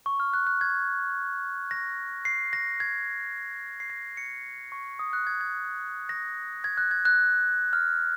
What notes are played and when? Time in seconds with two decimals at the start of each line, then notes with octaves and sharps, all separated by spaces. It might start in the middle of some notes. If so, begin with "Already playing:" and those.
0.06 C#6
0.20 F6
0.34 F#6
0.47 F#6
0.61 G#6
1.71 A#6
2.25 C7
2.53 A#6
2.80 G#6
3.80 C7
3.90 A#6
4.17 C#7
4.72 C#6
4.99 D#6
5.13 F#6
5.27 G#6
5.41 G#6
6.09 A#6
6.64 G#6
6.77 F#6
6.91 G#6
7.05 F#6
7.73 F6